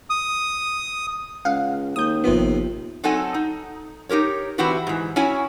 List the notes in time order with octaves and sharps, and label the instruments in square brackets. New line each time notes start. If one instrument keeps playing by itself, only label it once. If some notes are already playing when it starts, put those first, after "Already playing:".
[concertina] D#6
[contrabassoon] C#2 [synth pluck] F5 F#5
[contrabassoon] D#2 [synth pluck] D#6 G6
[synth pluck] G#1 B3 [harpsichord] C3 F3
[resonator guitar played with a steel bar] F#3 C4 D#4 A4 F#5 G#5
D#4
D#4 G4 A#4 C#5
E3 C4 E4 F#4 G4 B4
G#2 E3
C#4 E4 F#4 C#5 G#5